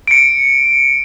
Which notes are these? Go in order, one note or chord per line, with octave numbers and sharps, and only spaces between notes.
C#7 D7